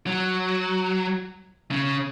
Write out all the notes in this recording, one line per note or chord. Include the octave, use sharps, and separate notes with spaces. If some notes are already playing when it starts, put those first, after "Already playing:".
F#3
C#3